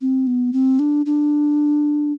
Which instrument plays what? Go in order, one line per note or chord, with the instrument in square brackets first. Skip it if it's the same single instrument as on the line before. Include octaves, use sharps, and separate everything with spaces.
[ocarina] C4
B3
C4
D4
D4